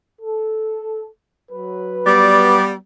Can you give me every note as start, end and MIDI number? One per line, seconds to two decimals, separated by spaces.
0.21 1.07 69
1.52 2.66 54
1.52 2.66 71
2.06 2.74 55
2.06 2.74 59
2.06 2.66 74